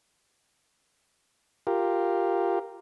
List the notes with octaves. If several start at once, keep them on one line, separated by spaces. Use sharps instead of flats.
F4 G4 A#4